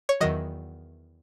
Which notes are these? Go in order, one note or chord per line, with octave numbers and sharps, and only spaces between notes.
C#5
E2 D#3 F#3 D#5